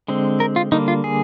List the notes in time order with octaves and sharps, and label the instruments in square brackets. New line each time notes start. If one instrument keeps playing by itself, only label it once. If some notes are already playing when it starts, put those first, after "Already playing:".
[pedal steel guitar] D3 G#3 C4
A#4
F4
D3 G3 A#3 D#4
F4
G#4